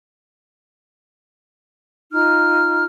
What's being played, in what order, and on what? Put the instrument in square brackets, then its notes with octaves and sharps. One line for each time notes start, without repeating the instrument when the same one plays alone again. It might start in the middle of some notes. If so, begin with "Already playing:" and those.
[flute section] D#4 F4 F6